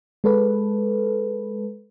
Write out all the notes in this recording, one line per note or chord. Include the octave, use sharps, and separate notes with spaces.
G#3 A4 B4